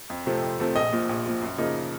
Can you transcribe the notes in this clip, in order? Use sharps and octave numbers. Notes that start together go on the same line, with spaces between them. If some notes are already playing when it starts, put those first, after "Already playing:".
F2
C3 F3 A3 C4
F2
C3 F3 A3 C4
A#1 D#5
A#2 F3
A#1
A#2 F3
F#2
C#3 F3 A#3 D#4